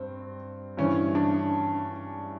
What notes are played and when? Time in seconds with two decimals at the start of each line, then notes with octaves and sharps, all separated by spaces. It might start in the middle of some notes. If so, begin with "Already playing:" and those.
Already playing: G2 C4
0.77 G2 E3 C#4
1.15 D4